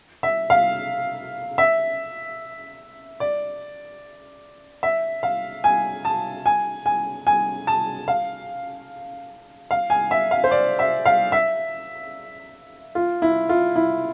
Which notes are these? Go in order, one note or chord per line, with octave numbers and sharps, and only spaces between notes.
E5
F5
E5
D5
E5
F5
G#5
A5
G#5
G#5
G#5
A5
F5
F5
G#5
E5
F5
C5
D5
E5
F5
E5
F4
E4
F4
E4